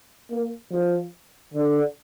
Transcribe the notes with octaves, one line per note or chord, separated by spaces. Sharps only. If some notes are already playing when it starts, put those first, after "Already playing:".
A#3
F3
D3